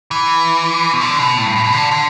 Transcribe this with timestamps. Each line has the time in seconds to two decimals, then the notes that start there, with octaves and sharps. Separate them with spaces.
0.11 E3
0.93 B2
1.01 D3
1.19 B2
1.37 A2
1.47 G2
1.56 A2
1.64 B2
1.73 D3
1.91 D3